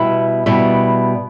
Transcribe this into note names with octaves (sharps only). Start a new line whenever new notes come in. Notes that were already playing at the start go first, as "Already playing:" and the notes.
Already playing: B2 G3 B3 E4
B2 G3 B3 E4